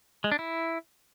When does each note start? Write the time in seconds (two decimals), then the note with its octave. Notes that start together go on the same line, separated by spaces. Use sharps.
0.24 G#3
0.32 D4
0.39 E4